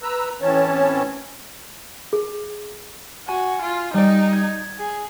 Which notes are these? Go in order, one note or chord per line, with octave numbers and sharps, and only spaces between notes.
B4 A#5 E6
A2 E3 C4 C#4 C#5 A5
G#4
F#4 G#5
F4
G3 D#4 D5
G#6
G#4